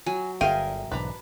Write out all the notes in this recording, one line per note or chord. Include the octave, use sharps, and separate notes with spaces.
F#3 G#5
G1 D3 G#4 A#4 E5 F5 G5 G#5
B1 G#2 E3 D4 B4 A#5